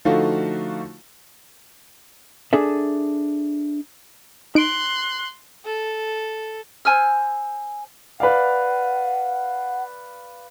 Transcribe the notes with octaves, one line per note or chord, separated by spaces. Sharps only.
D3 F3 A3 D#4 F4 F#4
D4 G#4 A4 E5
D#4 C6 F#6 D7
A4
C5 G#5 E6 F6
B4 D5 F5 F#5